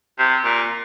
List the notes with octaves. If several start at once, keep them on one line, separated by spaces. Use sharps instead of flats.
C3
A#2